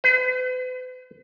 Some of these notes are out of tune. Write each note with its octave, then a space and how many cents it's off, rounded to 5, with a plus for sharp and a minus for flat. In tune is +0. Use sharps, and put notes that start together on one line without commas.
B4 +45